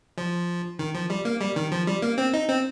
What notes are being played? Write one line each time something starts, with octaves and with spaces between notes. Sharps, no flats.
F3
D#3
F3
G3
A#3
G3
D#3
F3
G3
A#3
C4
D#4
C4